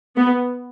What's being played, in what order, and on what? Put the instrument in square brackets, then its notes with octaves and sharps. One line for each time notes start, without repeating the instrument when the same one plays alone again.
[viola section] B3